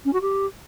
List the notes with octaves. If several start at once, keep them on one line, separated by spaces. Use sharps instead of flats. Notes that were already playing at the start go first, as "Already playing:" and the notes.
C#4
F#4
G4